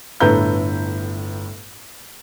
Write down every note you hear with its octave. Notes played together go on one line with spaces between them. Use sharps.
G1 A2 A4 B4 A#5 G6